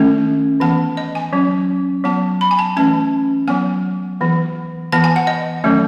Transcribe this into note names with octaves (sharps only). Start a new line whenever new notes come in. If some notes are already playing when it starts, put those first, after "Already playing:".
Already playing: D#3 A3 C#4
E3 B3 A5
D#5
G#5
F#3 C#4
F#3 B3 A5
B5
G#5
A5
E3 A3 C#4 A5
F#3 B3 G#5
E3 B3
E3 B3 A5
G#5
F#5
D#5
D#3 F#3 A3 C#4